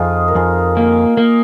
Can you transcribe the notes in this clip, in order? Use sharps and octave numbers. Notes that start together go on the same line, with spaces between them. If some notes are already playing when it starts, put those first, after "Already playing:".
Already playing: F2 D#4 F4 G#4
A#4
F2 G#4
A#3
A#3